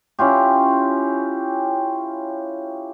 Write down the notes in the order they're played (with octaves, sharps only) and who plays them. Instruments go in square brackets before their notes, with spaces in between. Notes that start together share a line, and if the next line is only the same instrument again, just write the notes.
[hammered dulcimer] C#4 E4 F4 G4